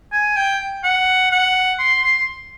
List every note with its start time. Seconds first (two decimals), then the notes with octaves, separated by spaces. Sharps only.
0.12 G#5
0.36 G5
0.84 F#5
1.31 F#5
1.79 C6
2.02 C6